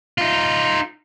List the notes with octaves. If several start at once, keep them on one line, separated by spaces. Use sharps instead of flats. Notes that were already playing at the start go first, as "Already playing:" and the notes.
D#4 F4